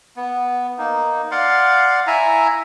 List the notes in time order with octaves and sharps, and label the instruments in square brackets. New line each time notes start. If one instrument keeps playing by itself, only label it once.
[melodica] B3
A#3 D#4
D5 F5 F#5 C6
E4 E5 G#5 A#5